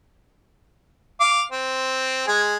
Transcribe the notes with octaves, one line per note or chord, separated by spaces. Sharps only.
F5 D6
C4
G#3 G#4